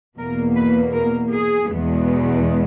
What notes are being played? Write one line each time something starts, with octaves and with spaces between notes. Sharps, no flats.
E2 B2 A#3 A#4
B4
A#4
G#4
E2 B2 G#3 B3